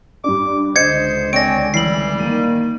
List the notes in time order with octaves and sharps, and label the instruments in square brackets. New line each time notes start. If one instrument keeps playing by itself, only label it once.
[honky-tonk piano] G2 D4 [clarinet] D6
[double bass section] C#2 D3 [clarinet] C5 [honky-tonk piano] D#5 [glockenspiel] G#6 C#7
[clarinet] C4 [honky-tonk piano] C#5 D5 G#5 [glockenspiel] A#6 D7
[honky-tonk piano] E3 E6 [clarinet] G3 [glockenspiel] C7 F#7
[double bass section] D#3 A#3 [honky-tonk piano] D#7